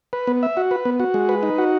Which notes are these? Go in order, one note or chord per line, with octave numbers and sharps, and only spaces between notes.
B4
B3
E5
F#4
B4
B3
F#4
G#3
B4
D#4
F#4